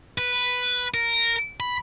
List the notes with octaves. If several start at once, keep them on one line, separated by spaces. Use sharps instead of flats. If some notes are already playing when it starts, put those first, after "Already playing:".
B4
A#4
B5